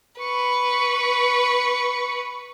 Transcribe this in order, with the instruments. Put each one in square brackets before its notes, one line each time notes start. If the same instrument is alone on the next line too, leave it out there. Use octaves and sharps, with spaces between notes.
[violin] B4 [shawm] C#6